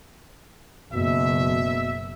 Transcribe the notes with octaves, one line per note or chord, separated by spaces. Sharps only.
F#1 B2 E5